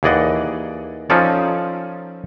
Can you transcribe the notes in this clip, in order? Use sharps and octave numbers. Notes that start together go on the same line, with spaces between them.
D#2 E3 G#4 D5 D#5 F#5
F3 C#4 D#4 F4 A4 D5